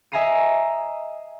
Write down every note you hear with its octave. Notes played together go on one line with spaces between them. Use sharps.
D#5 E5 G#5 A#5 C7 D#7